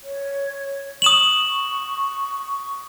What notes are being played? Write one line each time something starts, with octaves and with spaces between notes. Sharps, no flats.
C#5
C#6 D#6 E7 F#7